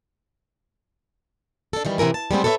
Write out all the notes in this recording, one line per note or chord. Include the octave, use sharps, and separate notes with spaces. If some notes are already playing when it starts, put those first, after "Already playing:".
D4 A4
D#3 E3 G3
C3 E3 E4 A#4 G#5
A5
G3 G#3 B3 C4
A4 B4 C#5 D#5 E5